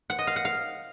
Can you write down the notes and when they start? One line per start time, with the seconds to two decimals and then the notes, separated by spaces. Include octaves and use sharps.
0.10 F#5
0.18 D#5
0.27 F5
0.36 F#5
0.45 F5